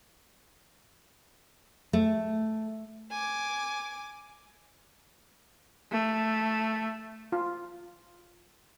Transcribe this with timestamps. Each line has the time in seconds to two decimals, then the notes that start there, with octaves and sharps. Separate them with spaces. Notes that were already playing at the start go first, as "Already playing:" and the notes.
1.93 A3
3.11 G#5 D6
5.91 A3
7.32 F4